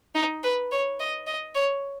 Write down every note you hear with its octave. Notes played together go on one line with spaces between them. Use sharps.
D#4
B4
C#5
D#5
D#5
C#5